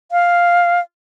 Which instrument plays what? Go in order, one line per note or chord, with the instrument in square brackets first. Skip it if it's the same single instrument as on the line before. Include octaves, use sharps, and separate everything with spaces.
[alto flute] F5